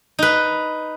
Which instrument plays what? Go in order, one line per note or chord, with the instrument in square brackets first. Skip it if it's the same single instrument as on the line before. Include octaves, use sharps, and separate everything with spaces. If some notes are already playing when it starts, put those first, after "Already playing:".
[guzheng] D#4 B4